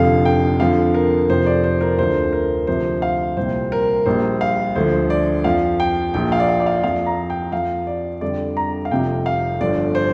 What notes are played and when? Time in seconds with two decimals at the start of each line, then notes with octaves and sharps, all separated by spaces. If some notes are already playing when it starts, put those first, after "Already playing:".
Already playing: F1 F2 D3 F3 F5
0.25 G5
0.60 F2 D3 F3 F5
0.94 A#4
1.29 F1 F2 F3 C5
1.46 D5
1.64 C5
1.81 A#4
1.98 D2 D3 F3 C5
2.33 A#4
2.67 D2 C3 F3 C5
3.02 F5
3.37 C2 A#2 G3 C5
3.72 A#4
4.06 A#1 A#2 G3 C5
4.41 F5
4.75 D2 D3 F3 C5
5.10 D5
5.44 F2 F3 F5
5.80 G5
6.14 A#1 A#2 F3 G5
6.32 F5
6.40 D5
6.49 F5
6.60 D5
6.66 F5
6.83 F2 F3 F5
7.07 A#5
7.30 G5
7.52 F2 F3 F5
7.87 D5
8.21 F2 D3 G3 D5
8.57 A#5
8.85 F5
8.91 F1 F2 C3 F3 G5
9.26 F5
9.60 G1 G2 D3 F3 D5
9.95 C5